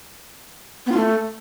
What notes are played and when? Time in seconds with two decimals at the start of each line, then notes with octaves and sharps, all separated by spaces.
0.86 B3
0.92 F4
0.97 A3